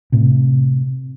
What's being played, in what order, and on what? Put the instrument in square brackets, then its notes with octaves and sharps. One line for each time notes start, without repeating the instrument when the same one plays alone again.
[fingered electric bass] A2 C3